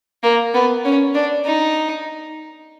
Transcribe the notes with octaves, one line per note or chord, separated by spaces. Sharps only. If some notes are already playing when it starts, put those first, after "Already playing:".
A#3
B3
C#4
D4
D#4